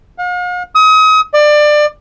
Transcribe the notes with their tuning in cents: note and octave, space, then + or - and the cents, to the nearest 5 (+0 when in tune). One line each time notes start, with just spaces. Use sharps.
F5 +45
D#6 +35
D5 +25